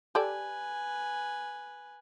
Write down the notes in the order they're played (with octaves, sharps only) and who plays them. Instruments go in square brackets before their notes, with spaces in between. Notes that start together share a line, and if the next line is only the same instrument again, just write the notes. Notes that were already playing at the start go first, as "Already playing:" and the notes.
[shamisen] G4 A4 D5 [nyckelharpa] B4 G#5